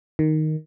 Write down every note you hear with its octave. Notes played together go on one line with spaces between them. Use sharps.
D#3